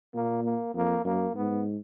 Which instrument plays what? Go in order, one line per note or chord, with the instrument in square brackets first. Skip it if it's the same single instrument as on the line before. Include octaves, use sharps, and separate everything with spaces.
[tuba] A#2 [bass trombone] A#3
[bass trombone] A#3
[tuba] F2 [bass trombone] A#3
[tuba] F#2 [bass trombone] A#3
[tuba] G#2 [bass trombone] B3